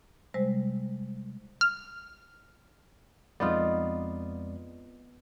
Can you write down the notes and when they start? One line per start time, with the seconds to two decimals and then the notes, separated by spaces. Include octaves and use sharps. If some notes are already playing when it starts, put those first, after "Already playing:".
0.34 C3 G3 G#3 C5
1.61 F6
3.40 F2 G#3 B3 D#4 F4 D5